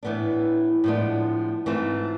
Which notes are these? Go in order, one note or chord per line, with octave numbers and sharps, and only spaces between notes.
A2 E3 B3 D4
A2 F3 G#3 B3 D4
G#2 E3 A3 C4 F4